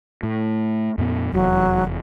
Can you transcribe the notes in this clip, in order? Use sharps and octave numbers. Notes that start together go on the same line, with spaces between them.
A2
F2 A#2 B3
F1 E2 F#3